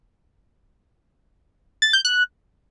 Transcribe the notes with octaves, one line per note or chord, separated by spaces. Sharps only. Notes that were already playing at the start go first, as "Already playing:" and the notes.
A6
G6
F#6